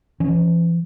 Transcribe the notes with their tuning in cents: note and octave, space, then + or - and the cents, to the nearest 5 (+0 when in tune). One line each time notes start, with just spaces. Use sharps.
E3 +45 C#4 +0